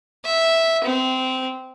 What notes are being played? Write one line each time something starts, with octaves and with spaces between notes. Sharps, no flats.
E5
C4